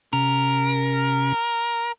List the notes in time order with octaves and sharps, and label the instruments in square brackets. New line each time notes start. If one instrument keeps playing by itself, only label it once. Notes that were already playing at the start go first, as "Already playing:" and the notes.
[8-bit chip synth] C3 C#4 [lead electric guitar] A#4